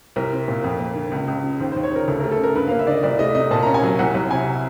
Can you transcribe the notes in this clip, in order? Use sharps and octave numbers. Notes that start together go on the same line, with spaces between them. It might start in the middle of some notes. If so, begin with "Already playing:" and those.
C2 A#4
C4
A#2
F2
A#3
D3
C#2
C#2
C#3
D#2 C5
D#2 C5
C#5
C#3 A#4
D2 A4
A3 A#4
A4
C#3 A#4
G2 B4
A#3 F5
E5
D3 D5 D#5
C2 D5
A3 D#5
C3 D#5
A#2 A5
C#4 A#5
G#5
F#3
C2 F#5
C2
C3 G#5